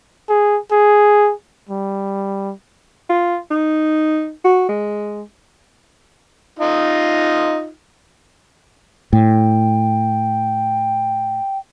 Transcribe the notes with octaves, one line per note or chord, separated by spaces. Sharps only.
G#4
G#4
G3
F4
D#4
F#4
G#3
D#4 F4
A2 G5